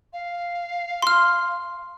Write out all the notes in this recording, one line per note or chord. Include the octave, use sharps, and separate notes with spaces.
F5
C6 F6